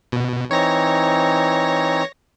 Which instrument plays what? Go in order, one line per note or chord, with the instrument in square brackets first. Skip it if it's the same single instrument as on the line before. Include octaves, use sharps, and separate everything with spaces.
[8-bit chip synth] B2
[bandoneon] E3 C4 D#4 [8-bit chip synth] C#5 A#6